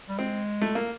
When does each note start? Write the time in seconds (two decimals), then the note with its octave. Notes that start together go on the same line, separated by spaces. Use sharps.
0.09 G3
0.18 G#3 C4
0.61 A3
0.75 A#3